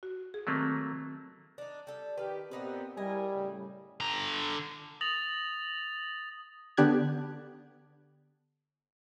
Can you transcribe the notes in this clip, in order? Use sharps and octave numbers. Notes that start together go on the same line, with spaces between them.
F#4
G#4
D#3 F#3 A3 A#3 C4
D4 D#4
G3 A4
D#3 G4 B4 F5
A#2 B3 C4 D#4 G4 B4
G3 E4 A#4 D#5 G#5
F#2 A2 C#3
D3 A#5
D#6 A6 A#6 F7 F#7
D3 B3 D4 G4 F#6 G#6